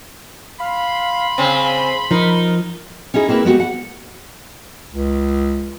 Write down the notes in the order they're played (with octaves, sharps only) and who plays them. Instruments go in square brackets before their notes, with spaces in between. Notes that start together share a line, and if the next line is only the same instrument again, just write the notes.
[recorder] F5 [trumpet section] B5 C6
[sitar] C#3 C4 [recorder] G#5
[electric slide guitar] F3 [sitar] D#4 [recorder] A#4
[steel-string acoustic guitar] C#4 D#4 E4 G#4
A#3 C4 E4 A#4 B4
G#3 B3 F#4 G4
F#5
[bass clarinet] C#2